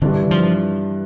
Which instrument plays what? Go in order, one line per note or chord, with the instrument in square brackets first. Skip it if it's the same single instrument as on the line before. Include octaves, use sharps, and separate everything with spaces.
[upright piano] G2 E3 G3 D4 [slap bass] D3
[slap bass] F3